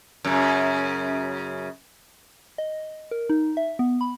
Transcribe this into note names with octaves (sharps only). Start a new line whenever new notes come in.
F#2 C#3
D#5
A#4
D#4
E5
B3
B5